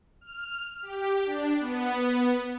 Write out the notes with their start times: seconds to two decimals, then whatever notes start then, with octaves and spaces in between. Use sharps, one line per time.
0.21 F6
0.82 G4
1.26 D4
1.60 B3